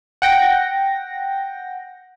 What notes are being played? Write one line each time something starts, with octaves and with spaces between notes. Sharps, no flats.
F#5 G5 A#6